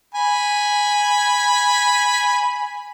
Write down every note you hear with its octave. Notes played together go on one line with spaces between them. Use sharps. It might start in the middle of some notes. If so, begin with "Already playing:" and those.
G#5 B5